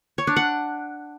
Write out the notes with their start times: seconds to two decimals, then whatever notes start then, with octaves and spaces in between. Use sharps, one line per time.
0.18 C#5
0.27 D4
0.36 F#5